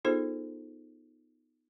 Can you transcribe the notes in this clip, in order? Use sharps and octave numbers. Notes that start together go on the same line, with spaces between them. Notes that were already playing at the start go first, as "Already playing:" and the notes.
B3 D#4 F4 G#4 A4 C5